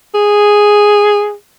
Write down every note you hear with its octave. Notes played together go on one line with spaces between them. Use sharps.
G#4